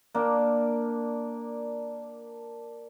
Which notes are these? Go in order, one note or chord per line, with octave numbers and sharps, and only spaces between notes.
A#3 D4